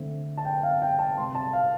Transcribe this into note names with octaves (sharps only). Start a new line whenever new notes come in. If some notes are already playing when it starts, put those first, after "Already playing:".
Already playing: D3 A3 C4
A5
G5
F5
G5
A5
C3 G3 C4 C6
A5
F5